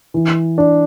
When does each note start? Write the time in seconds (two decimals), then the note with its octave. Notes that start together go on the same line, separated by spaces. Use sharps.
0.14 E3
0.58 D4